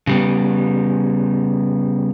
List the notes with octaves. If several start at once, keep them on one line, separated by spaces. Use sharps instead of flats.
C#3 G3 B3